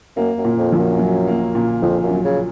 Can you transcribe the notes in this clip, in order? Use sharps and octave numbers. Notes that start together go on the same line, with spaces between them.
F#2 A#3
F#2
A#2
F2
A#1
F#2
F#3
A#3
A#2
A#1 F2
F#2
F#3
C#3